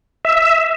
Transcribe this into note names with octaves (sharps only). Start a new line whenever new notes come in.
E5